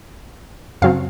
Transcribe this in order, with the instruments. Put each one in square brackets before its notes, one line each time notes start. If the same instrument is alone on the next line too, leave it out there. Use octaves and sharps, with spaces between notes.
[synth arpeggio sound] F#2 C#3 F#3 C4 F5